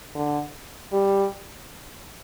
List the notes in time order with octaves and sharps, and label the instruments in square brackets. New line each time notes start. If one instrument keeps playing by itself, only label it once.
[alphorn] D3
G3